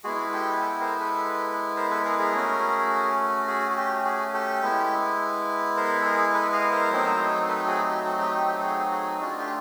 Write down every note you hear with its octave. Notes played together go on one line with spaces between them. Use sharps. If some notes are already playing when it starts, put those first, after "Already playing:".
G#3 B3 E4 F#4 G#4
G4 A4
G4 A4
A#4 C5
A4 B4
A#4 C5
A4 B4
G#4 A#4
G#4 A#4
A3 C#4 F#4
F#4 G#4
F#4
G4
F#4 G#4
G4 A4
G#3 B3 E4
A#4 C5
A4
G#4 A#4
A4 B4
D#5 F5
A#4 C5
F#3 A3 C4 D#4
A4 B4
F#4 G#4
G4
F#4
G4
G4
G4
A4
F#4 G#4
F#4 G#4
A3 D4 F4 F#4 G#4
G4